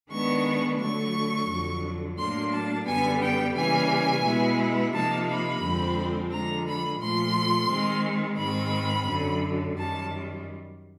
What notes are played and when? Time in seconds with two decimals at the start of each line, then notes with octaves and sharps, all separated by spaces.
0.11 D#3 G#3 B3 D4 C#6
0.80 D3 F#3 A3 C#6
1.48 F2 D3 F#3
2.18 A2 F#3 A#3 D4 C6
2.52 A5
2.86 F#2 D3 G3 B3 G#5
3.22 G5
3.55 C#3 E3 G3 A#3 G#5
4.25 B2 G#3 B3 E4
4.93 C3 F3 A#3 D#4 A5
5.29 B5
5.63 F2 D3 F3 G#3 C4
6.32 D3 F3 G#3 A#5
6.67 B5
7.00 A#2 F3 A3 C6
7.69 D#3 G#3 C4
8.38 G#2 D#3 G#3 C4 B5
9.08 F#2 D3 F#3
9.76 F#2 D#3 G3 A5